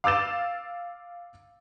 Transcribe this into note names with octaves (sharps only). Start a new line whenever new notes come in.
F5 D6 E6 A6 E7